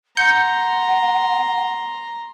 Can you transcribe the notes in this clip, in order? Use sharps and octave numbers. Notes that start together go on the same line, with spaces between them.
F#5 A#5 C6 G6 C#7